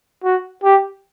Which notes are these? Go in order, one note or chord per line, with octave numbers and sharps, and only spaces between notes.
F#4
G4